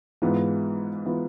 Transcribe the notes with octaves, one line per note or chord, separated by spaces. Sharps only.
G#2 E3 B3 F4
E3 B3 F4